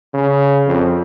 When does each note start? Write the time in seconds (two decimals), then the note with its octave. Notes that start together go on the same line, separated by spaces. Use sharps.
0.14 C#3
0.67 F2